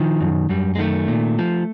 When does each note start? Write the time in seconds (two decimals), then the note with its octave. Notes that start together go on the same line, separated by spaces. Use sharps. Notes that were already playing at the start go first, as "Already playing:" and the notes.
Already playing: D#3 F3
0.21 F#2
0.49 F#2 G3
0.75 G#3
0.79 D#3 A3
1.08 A#2
1.39 F3